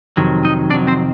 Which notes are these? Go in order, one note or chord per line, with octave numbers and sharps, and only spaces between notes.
F2 C3 D#3 F#3
D#4 D#5
F2 C3 D#3 F#3 D4 D5
C4 C5